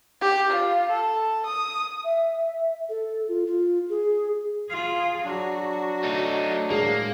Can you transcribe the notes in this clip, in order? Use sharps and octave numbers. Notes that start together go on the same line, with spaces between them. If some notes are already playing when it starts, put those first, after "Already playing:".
G4
F4
A4
D#6
E5
A4
F4
F4
G#4
F4 G#4
F#3 D4 F#4
A3 D#4
A2 G#3 A#3 G#4